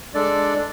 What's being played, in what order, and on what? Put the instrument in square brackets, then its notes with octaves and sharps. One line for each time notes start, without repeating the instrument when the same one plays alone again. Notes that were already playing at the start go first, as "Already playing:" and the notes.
[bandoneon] G#3 D4 A4 D5